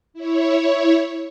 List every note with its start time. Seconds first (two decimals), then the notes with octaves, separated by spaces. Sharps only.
0.14 E4 C#5